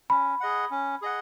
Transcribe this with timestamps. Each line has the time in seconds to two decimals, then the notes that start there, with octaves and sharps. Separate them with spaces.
0.10 C#4 B5
0.40 G#4 D#5 F#5
0.71 C#4
1.02 G#4 D#5 F#5